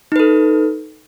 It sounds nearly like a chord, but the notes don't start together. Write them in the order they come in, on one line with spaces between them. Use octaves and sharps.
D#4 B4 A4